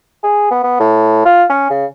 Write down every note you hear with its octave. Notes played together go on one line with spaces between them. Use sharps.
G#4
B3
B3
A2
F4
C#4
C#3